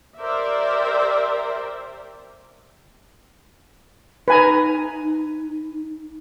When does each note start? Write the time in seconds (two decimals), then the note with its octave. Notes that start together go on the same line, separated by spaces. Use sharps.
0.19 G4 A#4 C5 D5 E5
4.28 D#4 B4 G#5 A#5